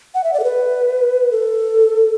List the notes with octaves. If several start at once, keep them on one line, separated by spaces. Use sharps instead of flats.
F#5
E5
D5
A4
B4
A4